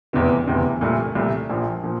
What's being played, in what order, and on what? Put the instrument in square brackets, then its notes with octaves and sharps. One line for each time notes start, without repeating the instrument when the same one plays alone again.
[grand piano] F1 E2 C3 E3
F1 E2 C3 E3
C2 A#2 A3
C2 A#2 A3
A#1 A#2 F3
A#2 F3